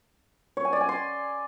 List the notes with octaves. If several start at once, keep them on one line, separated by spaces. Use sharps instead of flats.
C#5
G#5
D5
G#5
C6